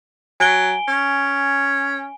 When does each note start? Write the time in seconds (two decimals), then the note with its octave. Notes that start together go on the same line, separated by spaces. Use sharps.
0.40 F#3 G#5 D7 G7
0.88 C#4